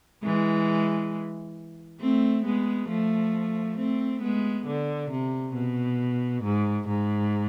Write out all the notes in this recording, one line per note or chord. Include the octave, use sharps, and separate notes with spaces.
E3 G#3
A3 C4
G#3 B3
F3 A3
A3 C4
G#3 B3
D3
C3
B2
G#2
G#2